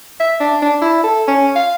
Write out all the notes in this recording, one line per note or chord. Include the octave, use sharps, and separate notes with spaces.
E5
D4
D4
E4
A4
C#4
F5